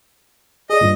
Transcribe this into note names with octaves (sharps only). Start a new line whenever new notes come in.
G#4 D5 D#5
G2 A#2